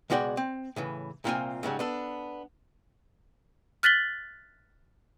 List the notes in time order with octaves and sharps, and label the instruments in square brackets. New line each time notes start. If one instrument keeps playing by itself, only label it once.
[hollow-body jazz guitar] C#2 B2 G#3 F#4 D5 G5
C4
A2 C#3 E3
C2 A#2 E3 C4 F4 G#5
G#2 C#3 F#3 G3
B3 D4 A4
[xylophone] F6 F#6 A6 B6 F#7 G7